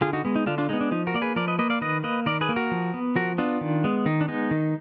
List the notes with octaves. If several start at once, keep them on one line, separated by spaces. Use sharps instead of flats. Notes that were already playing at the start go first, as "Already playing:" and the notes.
D3 F4 G#4
D#4 F#4
G#3 B3
D#4
D3 D4 F4
D4 F4
G#3 B3 D#4
D4
F3 D#4
F#4 A#4
A#3 D5
G#4 B4
F3 A#4 D5
B4 D#5
A#3 B4 D#5
D5 F5
D#3 B4 D#5
A#3 B4 D#5
D#3 A#4 D5
G#4 B4
A#3
F#4 A#4
F3
B3
F3 F#4 A#4
B3 D4 F4
D#3
G#3 B3
D#3 D#4
D4
G#3 B3 D#4
D#3